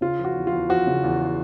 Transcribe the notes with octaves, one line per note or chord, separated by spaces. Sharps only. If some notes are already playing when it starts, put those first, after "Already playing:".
C#3 F4
F3
F#4
E2
F4
E2
F3 F#4
C#3
E2